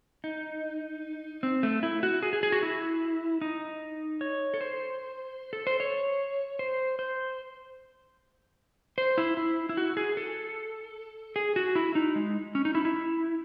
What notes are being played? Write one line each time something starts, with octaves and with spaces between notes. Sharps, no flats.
D#4
C4
A3
E4
F#4
G#4
G#4
G#4
F#4
E4
D#4
C#5
A4
C5
A4
C5
C#5
C5
C5
C5
E4
E4
E4
F#4
G#4
A4
G#4
F#4
E4
D#4
G#3
C#4
D#4
E4
E4